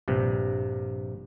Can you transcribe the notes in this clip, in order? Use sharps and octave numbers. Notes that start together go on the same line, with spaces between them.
A#1 G2 C3